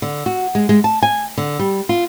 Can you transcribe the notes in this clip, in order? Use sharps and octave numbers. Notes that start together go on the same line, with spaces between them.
D3
F#4
G#3
G#3
A5
G#5
D3
G3
F4